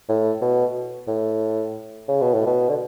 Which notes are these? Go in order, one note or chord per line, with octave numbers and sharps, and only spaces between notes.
A2
B2
A2
C#3
B2
A2
B2
D3